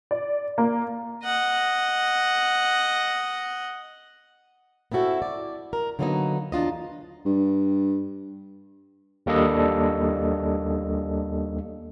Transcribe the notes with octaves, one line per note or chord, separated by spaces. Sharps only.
D5
A#3
D#5 F#5
B3 C4 E4 F#4 A4
D5
A#4
D3 F#3 A#3 B3 D4 D#4
E2 D4 F4 D#5
G2
D#2 G3 A#3 D4 A4 D#5